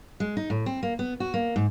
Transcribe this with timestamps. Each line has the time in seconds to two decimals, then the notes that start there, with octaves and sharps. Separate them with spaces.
0.20 G#3
0.37 D#4
0.50 A2
0.66 C4
0.83 A#3
0.99 B3
1.20 F#4
1.34 A#3
1.56 G#2